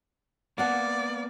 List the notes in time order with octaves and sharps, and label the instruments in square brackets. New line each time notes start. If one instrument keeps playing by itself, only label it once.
[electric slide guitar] A#3 B3 [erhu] D5 [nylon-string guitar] F5 F#5 A5